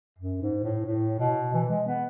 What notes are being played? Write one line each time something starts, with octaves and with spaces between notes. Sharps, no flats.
F#2
G#2
A2
A2
B2
E3
G#3
B3